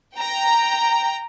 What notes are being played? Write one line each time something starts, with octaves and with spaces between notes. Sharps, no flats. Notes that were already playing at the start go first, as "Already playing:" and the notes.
G5 A#5